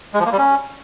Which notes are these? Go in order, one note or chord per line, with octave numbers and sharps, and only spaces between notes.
G#3
F3
A#3
G3
C#4